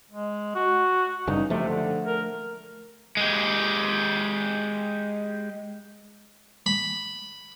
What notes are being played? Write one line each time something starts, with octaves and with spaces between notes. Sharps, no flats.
G#3
F#4
F#1 G2 C#3 D#4
C3 F3 A3
D3
A#4
G#3 G4
B5